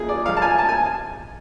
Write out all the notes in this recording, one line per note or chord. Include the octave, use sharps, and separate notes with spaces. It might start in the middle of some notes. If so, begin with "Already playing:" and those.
Already playing: F2 F3 G#3 G#4
D5
F2 F3 G#3 F5
A5
G#5
A5
G#5